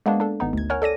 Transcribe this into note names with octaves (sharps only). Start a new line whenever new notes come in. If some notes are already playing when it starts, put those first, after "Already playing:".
G#3 A#3 B3 D4
D4 A4
G#1 B3 D#4
D2 G#6
A#4 C#5 F#5 G#5 F6
A4 D5 A#6 D#7